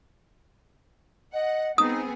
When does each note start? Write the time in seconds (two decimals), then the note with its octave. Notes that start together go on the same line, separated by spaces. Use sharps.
1.34 D#5 F#5
1.78 B3 C4 D#4 G#4 D#6